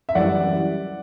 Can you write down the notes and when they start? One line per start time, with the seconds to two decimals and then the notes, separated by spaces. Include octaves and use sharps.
0.09 E5
0.15 F#2 E3 G3 D5 F#5